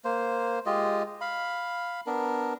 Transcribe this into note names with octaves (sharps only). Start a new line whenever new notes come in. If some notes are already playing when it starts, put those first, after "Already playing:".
A#3 C5
G#3 F4 G4 D#5
F5 B5
B3 D4 A#4